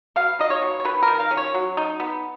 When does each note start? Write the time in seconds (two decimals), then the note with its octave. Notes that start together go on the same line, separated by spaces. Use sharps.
0.16 B2 F5
0.39 D#4 D#5
0.50 C#5
0.62 B2
0.80 C#5
0.85 D#3 B4
1.03 D#3 A#4
1.20 F5
1.31 C#4
1.37 C#5
1.55 F#3
1.77 D#4
2.00 B3